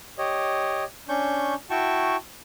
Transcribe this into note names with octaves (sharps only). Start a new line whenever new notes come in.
G4 C#5 D#5
C#4 D4 C#6 G6
E4 F#4 G5 A5 C#6